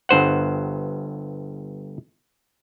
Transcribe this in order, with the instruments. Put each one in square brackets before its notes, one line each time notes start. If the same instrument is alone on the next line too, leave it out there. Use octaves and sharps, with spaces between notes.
[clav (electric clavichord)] G1 G2 C5 F#5